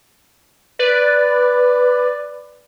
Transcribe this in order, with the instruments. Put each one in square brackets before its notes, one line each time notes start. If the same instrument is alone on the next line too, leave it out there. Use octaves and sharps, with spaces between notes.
[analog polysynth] B4 D5